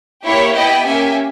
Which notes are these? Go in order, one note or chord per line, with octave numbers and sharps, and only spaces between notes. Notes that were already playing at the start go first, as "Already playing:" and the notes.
A#3 E4 G4 C#5 E5
B3 E4 G4 D#5 G5
A#3 C#4 G4 E5 G#5